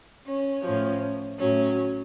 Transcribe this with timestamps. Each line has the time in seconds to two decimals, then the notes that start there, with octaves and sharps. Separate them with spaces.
0.26 C#4
0.63 A2 F3 C#4
1.38 A2 F#3 C#4